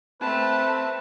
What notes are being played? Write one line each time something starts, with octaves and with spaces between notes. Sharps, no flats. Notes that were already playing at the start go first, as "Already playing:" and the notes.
A3 C4 B4 A5